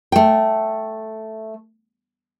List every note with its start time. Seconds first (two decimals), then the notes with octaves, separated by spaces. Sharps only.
0.12 A3 G5